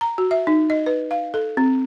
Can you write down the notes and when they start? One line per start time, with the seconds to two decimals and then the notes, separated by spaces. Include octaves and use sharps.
0.01 A#5
0.18 F#4
0.31 E5
0.47 D#4
0.70 D#5
0.86 B4
1.11 F5
1.34 A4
1.57 C4